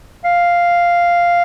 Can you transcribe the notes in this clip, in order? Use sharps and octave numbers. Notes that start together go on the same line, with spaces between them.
F5